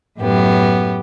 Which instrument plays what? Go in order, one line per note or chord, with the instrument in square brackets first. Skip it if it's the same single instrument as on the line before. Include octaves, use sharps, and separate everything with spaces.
[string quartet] F#2 A2 B3 G4